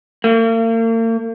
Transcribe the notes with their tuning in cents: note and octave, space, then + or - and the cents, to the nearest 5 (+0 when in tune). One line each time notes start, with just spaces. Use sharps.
A#3 -45